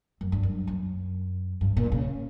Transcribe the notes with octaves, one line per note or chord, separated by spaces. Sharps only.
F#2
G2
F#2
F#2
G2
A#2
C#3